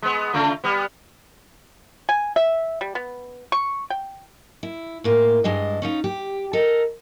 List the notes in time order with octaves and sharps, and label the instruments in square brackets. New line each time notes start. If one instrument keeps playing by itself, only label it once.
[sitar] G#3 B3
C#3 A3 F4
G3 B3
[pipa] G#5
E5
G3
B3
C#6
G5
[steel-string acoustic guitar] E4
A2 A#3 F4
G2 G#3 D4 D#5
C#4 D#4 F4
G4
A4 A#4 D#5